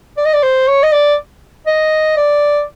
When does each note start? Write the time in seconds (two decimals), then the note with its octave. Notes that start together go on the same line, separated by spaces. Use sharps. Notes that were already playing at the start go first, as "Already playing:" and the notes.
0.17 D5
0.25 D#5
0.34 D5
0.43 C5
0.68 C#5
0.83 D#5
0.92 D5
1.67 D#5
2.17 D5